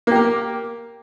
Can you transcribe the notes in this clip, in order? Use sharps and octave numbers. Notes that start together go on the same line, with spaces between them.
A#3 G4 A#4